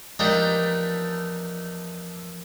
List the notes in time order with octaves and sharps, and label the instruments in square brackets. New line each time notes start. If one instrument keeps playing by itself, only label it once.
[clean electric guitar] E2 A3 [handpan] F3 A#4 F5 [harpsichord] D4 D#4 G4